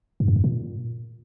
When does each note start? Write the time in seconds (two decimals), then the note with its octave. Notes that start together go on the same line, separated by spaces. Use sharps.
0.20 G2
0.28 F#2
0.36 F2
0.44 A#2